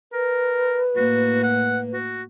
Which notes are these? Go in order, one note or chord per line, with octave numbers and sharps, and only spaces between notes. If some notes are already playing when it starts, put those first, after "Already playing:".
A#4 B4
A2 A#3 F#4
F#5
F#4